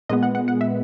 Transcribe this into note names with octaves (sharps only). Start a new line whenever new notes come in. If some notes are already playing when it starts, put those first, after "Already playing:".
A#2 G#3 B3 D#5
F#5
F#5
F#5
E5